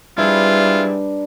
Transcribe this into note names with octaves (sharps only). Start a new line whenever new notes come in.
G3 G#3 C4 D4 E4 F4 B4 A#5